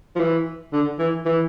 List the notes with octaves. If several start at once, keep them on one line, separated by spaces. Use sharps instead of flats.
F3
E3
D3
E3
E3